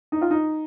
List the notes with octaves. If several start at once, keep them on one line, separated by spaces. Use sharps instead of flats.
D#4
F4
D#4